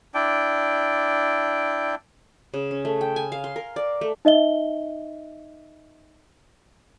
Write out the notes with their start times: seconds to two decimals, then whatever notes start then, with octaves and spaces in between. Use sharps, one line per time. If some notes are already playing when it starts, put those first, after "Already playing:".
0.14 D4 E4 D5 G5
2.54 C#3
2.71 C#4
2.85 A3
3.01 G5
3.16 G#5
3.32 F5
3.44 C6
3.56 A#4
3.76 D5
4.01 A3
4.25 D#4 D#5 E5 G7